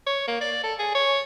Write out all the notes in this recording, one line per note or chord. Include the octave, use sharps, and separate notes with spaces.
C#5
A#3
D5
A4
G#4
C#5